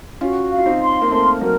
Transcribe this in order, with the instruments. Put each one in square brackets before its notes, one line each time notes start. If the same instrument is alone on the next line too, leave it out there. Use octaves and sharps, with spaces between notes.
[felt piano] C#4 F4 [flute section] F#4
[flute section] F5
[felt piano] F4
C4 D#4
[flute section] C6
[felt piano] A#3
[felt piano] A3 C4 [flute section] A#4
[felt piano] F#3 A#3 [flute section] A#4